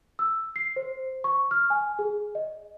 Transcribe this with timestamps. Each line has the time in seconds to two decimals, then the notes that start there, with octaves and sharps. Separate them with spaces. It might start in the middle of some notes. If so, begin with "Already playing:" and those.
0.19 E6
0.56 C7
0.76 C5
1.24 C#6
1.51 F6
1.70 G#5
1.99 G#4
2.35 D#5